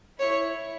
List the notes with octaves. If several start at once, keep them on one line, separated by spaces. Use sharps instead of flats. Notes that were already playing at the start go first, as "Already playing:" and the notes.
E4 C#5